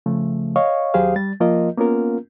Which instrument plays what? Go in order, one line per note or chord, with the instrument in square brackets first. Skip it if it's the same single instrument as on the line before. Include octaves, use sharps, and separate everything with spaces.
[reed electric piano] C#3 F3 A3
C#5 D#5 F5 C#6
D#2 F#3 G4 G#4 C5 F5
G3 A6
F3 A#3 F4 A#4 D#5
A#3 B3 C#4 F4 A#4